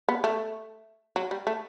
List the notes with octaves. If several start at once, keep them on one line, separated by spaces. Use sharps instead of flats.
B3
A3
F#3
G3
A3